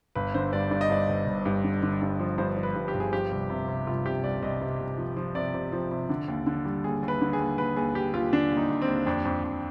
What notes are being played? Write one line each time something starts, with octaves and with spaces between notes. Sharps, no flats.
G1 B4
D3 C5
G2 D5
G2 D5
D#5
G2 D5
G1
G1
G2
D3
D3
G2
F3
G2 C5
F3
B4
G2
G4
G1
G#4
F3 G4
C2
C3
C3
C2 F4
C3 G4
C2 D5
C2 D#5
C3
C2
F3
F3
C3 D5
C3
F3
C3
D3
D#2
D3
G3
D#2 G#4
D#2
B4
D3
G#4
D#2
D#2 B4
D#2 G#4
D#2 G4
D#2 F4
D3 D4
D#2
D#4
D#2
C4
D#2
F2 D4
F2
F2